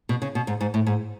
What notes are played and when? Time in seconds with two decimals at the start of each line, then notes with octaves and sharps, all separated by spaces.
0.09 B2
0.22 C#3
0.35 B2
0.47 G#2
0.61 G#2
0.74 A2
0.87 G#2